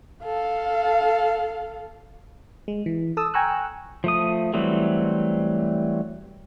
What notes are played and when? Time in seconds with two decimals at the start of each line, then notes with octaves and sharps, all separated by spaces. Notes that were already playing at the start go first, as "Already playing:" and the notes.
0.24 A4 F5
2.68 G#3
2.86 E3
3.17 A4 A5 D#6 E6
3.34 G5 G#5 A#5 C#6 E6 F#6
4.04 F3 A3 D#6
4.53 E3 F#3 G3 A3 C4